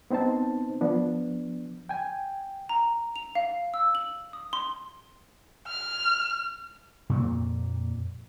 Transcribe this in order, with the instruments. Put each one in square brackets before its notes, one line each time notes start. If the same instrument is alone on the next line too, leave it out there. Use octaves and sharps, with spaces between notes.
[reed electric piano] B3 C4 D#4 C5 A5
F3 B3 D4
G5 G#5
[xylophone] A#5
F7
F5
E6
F#7
D#6
C6
[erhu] F6
[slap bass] F2 A#2 A#3